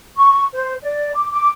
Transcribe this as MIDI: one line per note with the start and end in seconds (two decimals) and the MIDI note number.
0.16 0.45 85
0.53 0.74 72
0.82 1.12 74
1.14 1.30 86
1.32 1.50 86